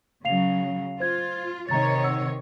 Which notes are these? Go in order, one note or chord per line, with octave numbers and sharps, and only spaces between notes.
C#3 F#3 F5 C7 F7
F4 C5 G#6
C3 D#3 C#5 A#5 A6
F#5 E6